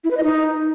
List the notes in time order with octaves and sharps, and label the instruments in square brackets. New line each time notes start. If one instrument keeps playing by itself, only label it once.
[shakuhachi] E4
B4
D#5
D#4